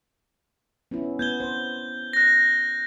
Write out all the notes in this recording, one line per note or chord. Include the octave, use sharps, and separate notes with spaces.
B3 C#4 E4
B3 G6 G#6 G7
C5
F#6 A#6